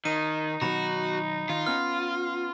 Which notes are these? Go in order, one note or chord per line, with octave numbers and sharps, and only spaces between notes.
D#3 D#4 D#7
B2 D#3 F#3 F#4 A#5 B5 A#6
D#3 F4
B3 C#4 F6